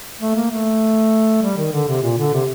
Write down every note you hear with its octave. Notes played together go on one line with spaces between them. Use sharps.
A3
A#3
A3
G3
D#3
D3
C3
A#2
D3
C3